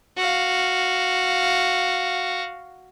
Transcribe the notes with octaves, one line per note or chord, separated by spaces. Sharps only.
F#4 F5